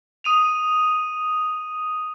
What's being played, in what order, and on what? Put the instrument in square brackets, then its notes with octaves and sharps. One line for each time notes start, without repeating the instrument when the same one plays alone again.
[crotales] D#6 D#7 F7